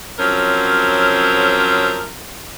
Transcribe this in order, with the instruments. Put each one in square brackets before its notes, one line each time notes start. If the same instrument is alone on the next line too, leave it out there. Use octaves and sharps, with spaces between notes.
[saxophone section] F3 F#3 C4 C#4 A#4